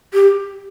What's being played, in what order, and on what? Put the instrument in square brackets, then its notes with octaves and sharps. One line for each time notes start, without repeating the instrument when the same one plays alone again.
[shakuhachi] G4